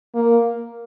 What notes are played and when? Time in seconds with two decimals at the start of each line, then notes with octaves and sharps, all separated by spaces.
0.15 A#3